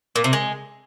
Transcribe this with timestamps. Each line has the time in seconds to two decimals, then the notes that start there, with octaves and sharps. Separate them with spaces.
0.16 A#2
0.24 C3
0.33 G#3